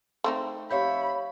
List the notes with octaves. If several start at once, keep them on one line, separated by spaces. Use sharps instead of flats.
A3 C4 D#4
F2 G4 C#5 E5 F5 B5 G6